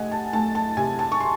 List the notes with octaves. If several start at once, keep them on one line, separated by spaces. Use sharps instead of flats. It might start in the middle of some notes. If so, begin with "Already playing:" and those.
Already playing: C3 A3 D#5 F#5 G#5
A5
A3 A5
A5
C3 G#5
A5
C#6
C6